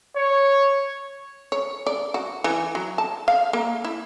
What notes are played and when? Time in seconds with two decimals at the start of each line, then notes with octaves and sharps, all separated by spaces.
0.17 C#5
1.52 C#5
1.87 D5
2.14 F#4
2.44 E3
2.75 F#3
2.98 A5
3.28 F5
3.53 A#3
3.85 E4